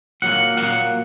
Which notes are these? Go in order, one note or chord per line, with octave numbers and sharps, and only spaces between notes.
A#2 F#3 A#3 F#5
A#2 F#3 A#3 F#5